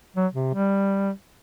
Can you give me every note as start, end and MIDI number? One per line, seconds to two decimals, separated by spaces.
0.16 0.26 54
0.33 0.51 48
0.54 1.11 55